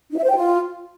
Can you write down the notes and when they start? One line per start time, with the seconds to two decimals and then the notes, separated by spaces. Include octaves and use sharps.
0.11 D#4
0.17 E5
0.24 C5
0.30 G5
0.36 F4